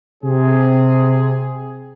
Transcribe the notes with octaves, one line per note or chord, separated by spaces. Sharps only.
C3 C4 G#4